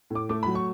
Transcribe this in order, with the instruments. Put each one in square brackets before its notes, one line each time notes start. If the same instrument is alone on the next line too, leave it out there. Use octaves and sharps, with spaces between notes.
[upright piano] A2 D6
A3 D6
F#3 B5
C#6